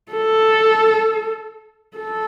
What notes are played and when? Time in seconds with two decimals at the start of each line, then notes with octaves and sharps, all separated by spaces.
0.11 A4
1.97 A4